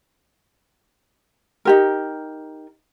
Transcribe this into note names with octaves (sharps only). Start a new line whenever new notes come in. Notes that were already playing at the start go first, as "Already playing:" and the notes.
D#4 G4 A#4